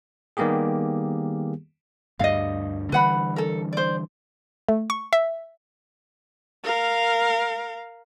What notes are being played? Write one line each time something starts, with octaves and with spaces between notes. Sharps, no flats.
D#3 G3 A#3 B3 G4 G#4
D2 G2 G3 D#5 F5
D3 E3 G3 B4 F#5 B5
A4 A#4
C5 D5
A3
C#6
E5
A#4 F5